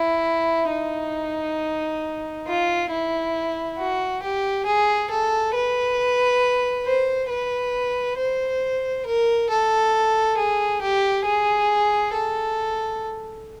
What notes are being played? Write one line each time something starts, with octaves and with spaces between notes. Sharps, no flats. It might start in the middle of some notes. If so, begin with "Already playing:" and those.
Already playing: E4
D#4
F4
E4
F#4
G4
G#4
A4
B4
C5
B4
C5
A#4
A4
G#4
G4
G#4
A4